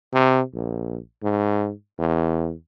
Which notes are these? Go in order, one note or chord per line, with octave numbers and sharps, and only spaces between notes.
C3
A#1
G#2
E2